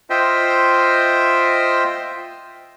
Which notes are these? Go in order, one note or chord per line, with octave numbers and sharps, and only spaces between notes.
F4 C5 D#5 E5 G5